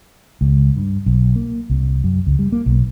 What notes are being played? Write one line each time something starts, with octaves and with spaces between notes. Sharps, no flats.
C#2
G2
B1
A#3
C2
F#2
C#2
G3
A#3
B1